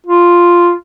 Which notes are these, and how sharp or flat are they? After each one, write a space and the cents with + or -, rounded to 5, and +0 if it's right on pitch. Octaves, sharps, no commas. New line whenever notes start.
F4 +0